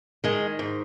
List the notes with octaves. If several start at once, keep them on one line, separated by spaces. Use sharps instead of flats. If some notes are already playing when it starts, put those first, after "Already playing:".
D#3 G#3
G#2